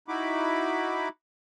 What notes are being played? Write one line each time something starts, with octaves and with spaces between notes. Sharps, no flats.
D#4 E4 F#4 B5 D6